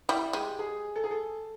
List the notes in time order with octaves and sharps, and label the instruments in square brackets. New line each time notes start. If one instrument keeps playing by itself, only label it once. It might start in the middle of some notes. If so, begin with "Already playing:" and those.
[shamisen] G3 [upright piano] E4
[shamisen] G#3 [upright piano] G4
[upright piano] G#4
A4
G#4
A4